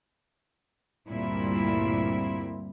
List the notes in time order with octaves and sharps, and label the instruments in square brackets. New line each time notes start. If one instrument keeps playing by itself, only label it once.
[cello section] D2 G2 A#2 G3 C4 E4